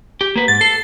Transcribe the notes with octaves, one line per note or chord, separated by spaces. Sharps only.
G4
A#3 B4
G#2 A6
A4 C7